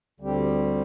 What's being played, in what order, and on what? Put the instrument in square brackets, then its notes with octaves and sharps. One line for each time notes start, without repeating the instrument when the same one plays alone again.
[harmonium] D2 D3 G3 C4 G4